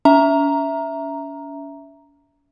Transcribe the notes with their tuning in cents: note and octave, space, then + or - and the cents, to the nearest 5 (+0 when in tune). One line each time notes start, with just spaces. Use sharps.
C#4 +40 E5 +0 A#5 +0